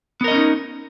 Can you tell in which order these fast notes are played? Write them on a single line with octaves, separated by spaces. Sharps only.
B3 A#4 D#5 C#4 D#4